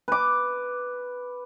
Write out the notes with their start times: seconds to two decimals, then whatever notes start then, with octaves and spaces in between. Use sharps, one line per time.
0.08 B4 D6